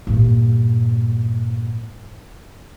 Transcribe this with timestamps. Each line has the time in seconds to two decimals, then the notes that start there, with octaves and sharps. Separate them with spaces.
0.07 G2 A#2